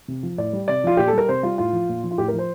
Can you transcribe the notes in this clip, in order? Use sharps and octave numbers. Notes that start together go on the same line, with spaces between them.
C3
F3
A2 D5
G3
C3 D5
F3 F4
A#2 G4
A4
G3 A#4
C3 C5
G3 F4
A2 F4
F3
A#2
F3
F4
A2 G4
A#4
F3
C5